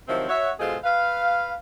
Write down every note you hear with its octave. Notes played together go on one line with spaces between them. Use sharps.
C3 D#3 F3 F#3 C4 E4
F#4 C#5 E5
B2 G#3 F4 G#4 A4 C5
B4 F5